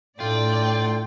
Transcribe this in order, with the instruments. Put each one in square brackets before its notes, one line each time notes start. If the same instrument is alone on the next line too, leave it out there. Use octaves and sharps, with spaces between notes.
[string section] A2 D5 [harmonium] D4 A4 [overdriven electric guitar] F4 [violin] G5